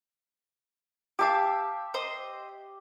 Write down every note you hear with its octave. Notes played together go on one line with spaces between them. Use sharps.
G4 E5 F5 A5 D6
C5 D#5 C6